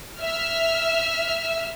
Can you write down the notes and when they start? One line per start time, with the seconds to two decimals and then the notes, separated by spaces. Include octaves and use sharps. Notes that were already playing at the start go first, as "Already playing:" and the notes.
0.19 E5 F6